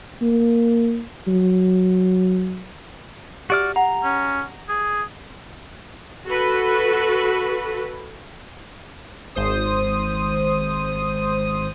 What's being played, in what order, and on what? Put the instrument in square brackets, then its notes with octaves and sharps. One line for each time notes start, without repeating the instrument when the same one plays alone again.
[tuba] A#3
F#3
[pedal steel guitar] F#4 D5 F6 [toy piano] G4 E5 D#6
[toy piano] F#5 [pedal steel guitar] A#5
[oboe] C#4
G#4
[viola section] F#4 A4 B4
[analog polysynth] G#1 C5 D#6